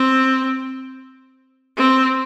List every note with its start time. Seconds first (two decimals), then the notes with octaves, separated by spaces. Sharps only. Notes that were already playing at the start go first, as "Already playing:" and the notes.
Already playing: C4
1.77 C4